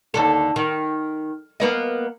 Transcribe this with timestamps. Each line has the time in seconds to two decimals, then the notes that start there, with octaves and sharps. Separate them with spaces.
0.14 D#2 D3 A4
0.56 D#3
1.60 A#3 B3 D#5